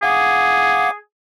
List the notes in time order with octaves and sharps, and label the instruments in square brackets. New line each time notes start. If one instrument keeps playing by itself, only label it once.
[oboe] G#4 [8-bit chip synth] F5 F#5 D6